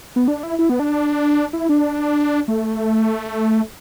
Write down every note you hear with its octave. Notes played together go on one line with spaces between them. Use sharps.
B3
D4
E4
E4
B3
D4
E4
D4
A3